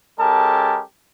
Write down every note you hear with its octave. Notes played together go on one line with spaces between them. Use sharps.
G#3 C#4 G4 A4 A#4 A5